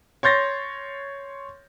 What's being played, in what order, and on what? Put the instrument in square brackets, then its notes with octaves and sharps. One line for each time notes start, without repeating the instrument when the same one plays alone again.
[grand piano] C#5 C6 G6 A6 A#6